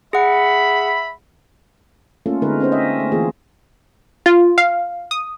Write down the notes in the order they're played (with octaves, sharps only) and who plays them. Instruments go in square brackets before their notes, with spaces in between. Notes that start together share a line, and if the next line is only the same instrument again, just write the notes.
[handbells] G#4 F#5 [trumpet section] E5 B5
[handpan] A3 A#3 C#4 F4 A4
D3 G#3 B3 D#4 A#4 B4
C4 C#4 C5
D#5 E5
A3
E3 A#3 F4 G#4
[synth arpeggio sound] F4
F5
D#6